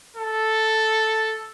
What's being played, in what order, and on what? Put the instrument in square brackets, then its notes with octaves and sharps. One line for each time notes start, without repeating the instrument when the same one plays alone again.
[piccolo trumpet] A4